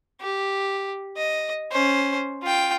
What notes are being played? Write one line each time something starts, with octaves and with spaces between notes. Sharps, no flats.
G4
D#5
C#4 C5
F4 G5